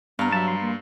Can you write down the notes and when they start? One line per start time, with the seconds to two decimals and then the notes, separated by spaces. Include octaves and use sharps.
0.19 G2 B3 F5 A#5
0.32 F#3 E5 A5
0.48 G3 C6
0.62 A#3